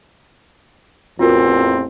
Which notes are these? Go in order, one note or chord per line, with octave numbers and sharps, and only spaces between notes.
A1 E2 C4 F4 F#4 A#4